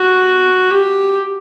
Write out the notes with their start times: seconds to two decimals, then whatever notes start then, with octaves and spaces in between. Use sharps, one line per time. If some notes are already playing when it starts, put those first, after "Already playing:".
Already playing: F#4
0.70 G4